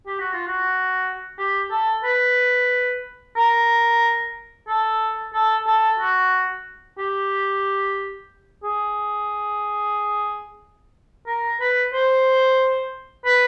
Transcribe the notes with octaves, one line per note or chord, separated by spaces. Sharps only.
G4
F#4
F4
F#4
G4
A4
B4
A#4
A4
A4
A4
F#4
G4
G#4
A#4
B4
C5
B4